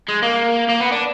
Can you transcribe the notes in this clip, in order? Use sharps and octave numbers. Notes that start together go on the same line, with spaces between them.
G#3
A#3
A#3
B3
D4